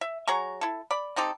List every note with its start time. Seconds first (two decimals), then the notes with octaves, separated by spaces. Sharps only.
0.01 E5
0.28 F#3 G#4 A#5 C#6
0.61 E4 A4
0.91 D5 B5
1.16 C4 D#4 G4 A4